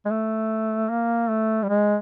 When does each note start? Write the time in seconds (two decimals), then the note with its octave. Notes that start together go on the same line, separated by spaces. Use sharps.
0.05 G#3
0.10 A3
0.89 A#3
1.29 A3
1.63 G3
1.69 G#3